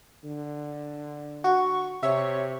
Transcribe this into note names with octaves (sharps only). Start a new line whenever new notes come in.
D3
F#4 C#6
C3 C#5 E5